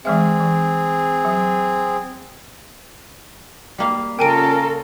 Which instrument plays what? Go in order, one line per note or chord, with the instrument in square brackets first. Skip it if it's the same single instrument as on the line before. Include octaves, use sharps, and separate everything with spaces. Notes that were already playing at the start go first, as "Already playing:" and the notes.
[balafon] E3 G#3 E5 [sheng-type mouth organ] C4 G#4
[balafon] E3
F#3
[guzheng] G3 A#3 F5
[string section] C#3 F4 A4 [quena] A#4 [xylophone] G5 G#5 D7